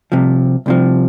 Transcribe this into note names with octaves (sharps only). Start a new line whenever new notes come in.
C2 C3 F3
C2 C3 F3